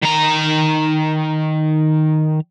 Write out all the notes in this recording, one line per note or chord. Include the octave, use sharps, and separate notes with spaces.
D#3 A#5